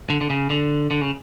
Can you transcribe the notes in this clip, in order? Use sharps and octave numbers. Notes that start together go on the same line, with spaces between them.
D3
D3
C#3
D3
D3
C#3